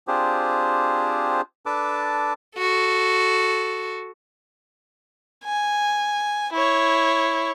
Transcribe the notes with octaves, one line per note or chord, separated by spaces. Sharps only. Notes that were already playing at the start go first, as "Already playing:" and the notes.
C4 D4 F4 G4 G#4 C5
D4 A4 B4 A5 D6
F#4 A4
G#5
E4 C#5